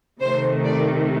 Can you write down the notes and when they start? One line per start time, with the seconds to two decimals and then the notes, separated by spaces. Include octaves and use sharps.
0.20 C3 D#3 A3 C5
0.65 D5